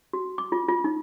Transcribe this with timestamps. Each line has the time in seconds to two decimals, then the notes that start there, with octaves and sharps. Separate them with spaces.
0.13 F#4
0.38 D6
0.52 F4
0.68 F4
0.84 D#4